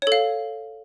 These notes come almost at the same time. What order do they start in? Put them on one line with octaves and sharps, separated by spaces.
C#5 A4 F5